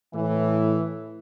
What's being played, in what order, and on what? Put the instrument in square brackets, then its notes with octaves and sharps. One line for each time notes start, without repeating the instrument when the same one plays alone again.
[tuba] A2 [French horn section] E3